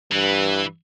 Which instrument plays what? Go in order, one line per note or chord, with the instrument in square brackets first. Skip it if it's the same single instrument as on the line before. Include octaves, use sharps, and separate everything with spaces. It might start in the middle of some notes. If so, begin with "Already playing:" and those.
[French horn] G2 [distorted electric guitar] E3